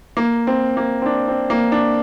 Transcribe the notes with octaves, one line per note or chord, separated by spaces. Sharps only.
A#3
C4
A#3
C4
D4
C4
A#3
D4